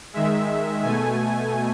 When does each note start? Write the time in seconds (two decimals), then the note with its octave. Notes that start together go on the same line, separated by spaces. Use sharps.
0.13 D#3 G#3 E5
0.82 B2 A3 G#5